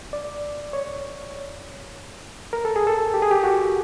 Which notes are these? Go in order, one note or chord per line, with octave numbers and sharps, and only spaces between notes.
D5
C#5
A#4
A4
G#4
A4
G4
G#4
G4
F#4